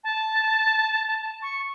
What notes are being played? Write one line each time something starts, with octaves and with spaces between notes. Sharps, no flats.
A5
C#6